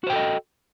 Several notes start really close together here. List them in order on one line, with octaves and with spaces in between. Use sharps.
F#4 C5 G5 A4 D#5